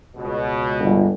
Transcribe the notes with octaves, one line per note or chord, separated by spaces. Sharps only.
C#2 B2
G1